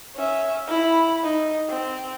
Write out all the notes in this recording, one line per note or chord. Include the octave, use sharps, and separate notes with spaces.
C#4 E5
E4 B5
D#4
C4